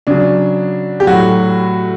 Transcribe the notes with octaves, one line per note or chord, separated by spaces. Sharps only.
C#3 F#3 D4
G4
A2 F#3 F#4